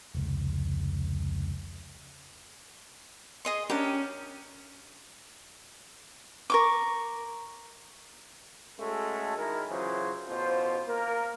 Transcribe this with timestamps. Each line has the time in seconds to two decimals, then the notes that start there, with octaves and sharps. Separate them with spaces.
0.15 F1 C#2
3.45 G#4 D#5 C6
3.70 C#4 D4 G4 A#4 G5
6.50 A#4 C#6 D6
8.79 G#3 A3 C#4 F#4 A4
9.37 D#3 G#3 E4 A#4
9.69 C#3 E3 F#3 F4 G#4 C5
10.28 A1 B2 F4 C5
10.87 A#3 A#4